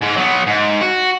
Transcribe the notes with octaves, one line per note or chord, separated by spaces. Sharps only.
G#2 G#3
F#3 B3
G#2
F#4